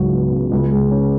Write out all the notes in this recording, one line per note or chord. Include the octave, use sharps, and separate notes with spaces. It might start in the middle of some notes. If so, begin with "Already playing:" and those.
Already playing: C#2 G#2 F#3
B3
C#3
C#2
G#3
C#4